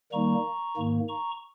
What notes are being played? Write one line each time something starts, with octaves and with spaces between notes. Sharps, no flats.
D#3 G3 A#3 D#4 A#5 C#6
G#2 D#3 A#3
A#5 C#6